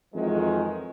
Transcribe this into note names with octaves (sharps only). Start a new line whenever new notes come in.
F2 D#3 E3 F#3 G#3